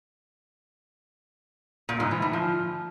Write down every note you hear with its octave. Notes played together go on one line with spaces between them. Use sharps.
A#2
G#2
E3
A2
F3